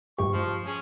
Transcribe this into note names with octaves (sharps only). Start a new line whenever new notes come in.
G2 G#3 G4 C#6
F3
C#4 G#4